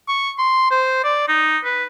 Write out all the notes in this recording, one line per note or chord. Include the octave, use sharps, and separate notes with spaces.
C#6
C6
C5
D5
D#4
B4